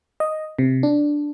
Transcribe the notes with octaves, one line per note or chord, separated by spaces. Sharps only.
D#5
C3
D4